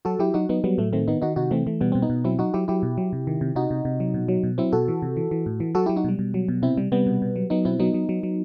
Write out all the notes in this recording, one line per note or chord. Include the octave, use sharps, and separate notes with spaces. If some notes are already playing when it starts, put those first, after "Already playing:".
F#3 F#4 A4
F#3 E4 G4
F#3 D#4 F#4
F#3 B3 D#4
F#3 G3 B3
A2 A3
D#3 A3 C4
D#3 B3 D#4
D#3 D#4 F#4
C3 D#4 F#4
E3 A3 C4
E3 A3
B2 G3 B3
B2 C4
B3 D#4
B2
F#3 C4 E4
F#3 D#4 F#4
F#3 E4 G4
F#3 E4 G4
B2
F#3
C3
D#3
C3
C3 D#4 F#4
C3
C3
F#3
B2
F#3
B2
F#3 C4 E4
B2 F#4 A4
E3
C3
E3
E3
A2
E3
F#3 F#4 A4
F#3 E4 G4
D#4 F#4
B2 G3
B2
F#3
B2
C3 C4 E4
C3 G3
C3 G3 B3
B2
B2
F#3
F#3 B3 D#4
B2 C4 E4
F#3 B3 D#4
F#3
F#3
F#3